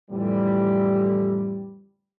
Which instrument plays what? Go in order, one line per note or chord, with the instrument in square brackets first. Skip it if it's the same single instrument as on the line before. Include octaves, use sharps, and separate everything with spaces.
[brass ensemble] F2 A2 D3 E3 G3